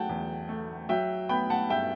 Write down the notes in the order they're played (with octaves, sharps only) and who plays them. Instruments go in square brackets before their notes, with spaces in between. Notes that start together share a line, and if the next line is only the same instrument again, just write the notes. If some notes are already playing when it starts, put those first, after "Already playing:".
Already playing: [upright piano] F#3 F#5 G5 A5
E2
A3
F#3 E5 G5
B3 G5 B5
F#5 A5
G2 E5 G5